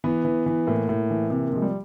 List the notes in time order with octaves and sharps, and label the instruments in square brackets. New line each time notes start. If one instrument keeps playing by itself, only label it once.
[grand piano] E3 B3
E3
E3
A2 A#3
A2
E3
C3 A#3
A#3
F3 G#3
G3